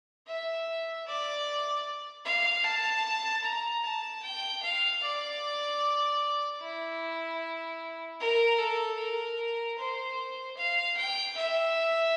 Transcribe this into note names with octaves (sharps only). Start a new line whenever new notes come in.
E5
D5
F5
A5
A#5
A5
G5
F5
D5
E4
A#4
A4
A#4
C5
F5
G5
E5